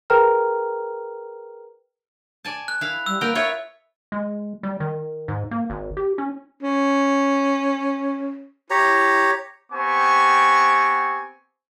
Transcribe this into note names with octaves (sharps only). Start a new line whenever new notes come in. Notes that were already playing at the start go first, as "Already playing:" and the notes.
G#4 A#4 B4 G5 A#5 F6
D5 G#5 A5
F#6
E4 F5
G3 E6
A#3 B3 A#4 G5
F4 C#5 E5 G5
G#3
G3
D#3
G#2
A#3
G#1
G4
C#4
C#4
E4 G4 C#5 A#5
B3 C4 G4 G#5 C#6